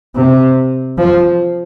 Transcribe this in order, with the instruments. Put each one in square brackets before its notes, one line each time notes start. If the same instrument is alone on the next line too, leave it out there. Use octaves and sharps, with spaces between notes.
[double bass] C3
F3